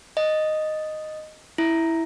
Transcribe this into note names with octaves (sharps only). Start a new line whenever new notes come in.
D#5
E4